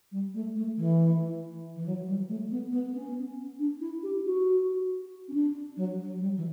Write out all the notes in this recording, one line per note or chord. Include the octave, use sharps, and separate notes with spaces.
G3
A3
A3
E3
E3
F#3
G3
A3
B3
B3
C#4
D4
E4
G4
F#4
C#4
D4
F#3
F#3
G3
E3